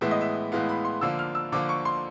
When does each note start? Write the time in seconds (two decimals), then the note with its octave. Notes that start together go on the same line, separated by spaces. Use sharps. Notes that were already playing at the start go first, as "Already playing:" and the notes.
0.01 A2 E3 G#3 B3 E5
0.11 D#5
0.21 E5
0.52 A2 E3 G#3 B3 F5
0.69 B5
0.85 C6
1.01 D3 F3 A#3 E6
1.19 F6
1.35 E6
1.52 D3 F3 A#3 D6
1.69 C#6
1.85 C6